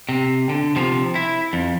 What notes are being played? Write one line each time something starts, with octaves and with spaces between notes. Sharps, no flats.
C3
D3
C3 F3
E4
F2